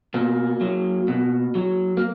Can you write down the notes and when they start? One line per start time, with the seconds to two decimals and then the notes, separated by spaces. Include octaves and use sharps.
0.14 B2 A#3
0.61 F#3
1.08 B2
1.55 F#3
1.97 A#3